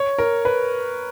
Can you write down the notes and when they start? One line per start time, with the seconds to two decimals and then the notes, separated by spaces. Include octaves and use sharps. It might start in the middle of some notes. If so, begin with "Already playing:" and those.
Already playing: C#5
0.18 A#4
0.45 B4